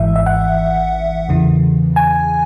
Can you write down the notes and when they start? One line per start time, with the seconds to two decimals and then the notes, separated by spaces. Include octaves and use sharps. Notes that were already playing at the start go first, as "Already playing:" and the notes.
Already playing: G#1 G#2 E3 E5
0.16 E5
0.26 F#5
1.29 E2 C#3 E3
1.96 G#5